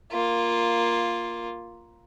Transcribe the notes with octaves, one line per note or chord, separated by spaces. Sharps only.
A#3 F4